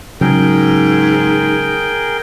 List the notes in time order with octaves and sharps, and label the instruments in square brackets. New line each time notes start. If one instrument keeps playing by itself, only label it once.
[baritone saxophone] G#2 [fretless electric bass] C#3 F#3 [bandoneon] G#4 A#4 G5